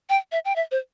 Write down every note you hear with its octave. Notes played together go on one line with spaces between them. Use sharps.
G5
E5
G5
E5
C5